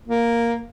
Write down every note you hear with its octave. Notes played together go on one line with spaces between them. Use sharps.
A#3